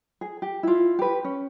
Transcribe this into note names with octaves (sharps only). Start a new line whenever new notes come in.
G#4
G4
E4 F4
G4 B4
C#4